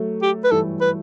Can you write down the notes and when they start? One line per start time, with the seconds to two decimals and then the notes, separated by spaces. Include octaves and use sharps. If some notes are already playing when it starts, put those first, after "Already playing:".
Already playing: F#3 A3
0.22 G4
0.44 B4
0.51 E3 G3 A4
0.81 B4